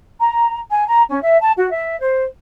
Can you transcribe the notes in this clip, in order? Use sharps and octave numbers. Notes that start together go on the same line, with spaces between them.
A#5
G#5
A#5
C#4
E5
A5
F#4
E5
C5